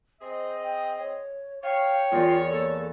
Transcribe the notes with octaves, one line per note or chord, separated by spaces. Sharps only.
C4 G#4 C5 D#5
G5
C#5
C#5 F5 G5
E2 F4 A#4 D5
A#3 A4